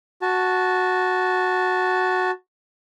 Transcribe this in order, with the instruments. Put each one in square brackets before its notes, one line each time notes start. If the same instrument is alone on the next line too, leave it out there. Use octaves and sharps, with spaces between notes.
[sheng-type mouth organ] F#4 A5